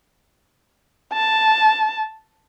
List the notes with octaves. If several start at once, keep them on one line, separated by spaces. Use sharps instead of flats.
A5